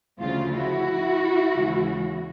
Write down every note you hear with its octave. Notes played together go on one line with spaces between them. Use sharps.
D2 C#3 F3 F4
E4 F#4
D#2 C#3 E3 G#3